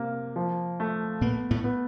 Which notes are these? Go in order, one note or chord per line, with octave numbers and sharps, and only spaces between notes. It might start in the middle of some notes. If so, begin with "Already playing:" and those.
Already playing: C3 A#3
F3
A3
A#2 A#3 B3
A2 A3
B3